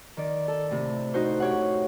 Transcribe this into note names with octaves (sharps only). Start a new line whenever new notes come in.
D#3 D5
A4
A2 C3
D#4 F#4 C5
G4 C#5 F#5